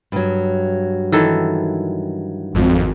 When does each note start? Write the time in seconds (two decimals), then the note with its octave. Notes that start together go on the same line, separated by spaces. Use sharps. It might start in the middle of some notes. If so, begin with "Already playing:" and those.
0.12 G2 F#3
1.12 D#3 E3 A4
2.54 G#1 F2